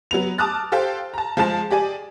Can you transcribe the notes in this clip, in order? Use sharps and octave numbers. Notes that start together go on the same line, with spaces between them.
F#3 B3 F7
A5 D6 D#6 F6 F#6 A6
G4 A4 C5 F5 G5
A5 A#5
F3 G#3 F5 A5 E7
G4 G#4 D5 G#5